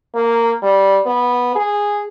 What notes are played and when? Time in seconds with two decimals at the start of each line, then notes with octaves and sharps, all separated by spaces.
0.15 A#3
0.62 G3
1.06 B3
1.55 G#4